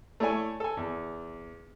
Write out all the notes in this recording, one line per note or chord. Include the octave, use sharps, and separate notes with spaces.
A3 E4 A4 C#5 D5 G#5
A4 G#5
E2